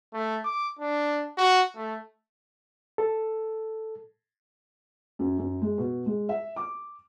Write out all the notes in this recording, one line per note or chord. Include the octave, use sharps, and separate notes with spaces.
A3
D6
D4
F#4
A3
A4
F#2
F#2
G#3
B2
G#3
E5
D6